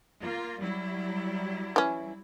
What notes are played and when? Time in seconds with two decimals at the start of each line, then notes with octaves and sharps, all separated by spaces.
0.20 A#3 F4
0.61 F#3 G3 E4
1.76 E3 C#4